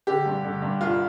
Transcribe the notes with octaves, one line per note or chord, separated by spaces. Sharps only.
D3 G4
G2
D3
G2
C2 F4